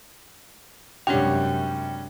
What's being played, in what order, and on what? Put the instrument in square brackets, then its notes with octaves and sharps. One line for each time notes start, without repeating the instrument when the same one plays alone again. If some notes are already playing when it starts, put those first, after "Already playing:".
[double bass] F#2 C3 [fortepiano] G3 C#4 F#4 [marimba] G#3 D4 [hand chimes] G5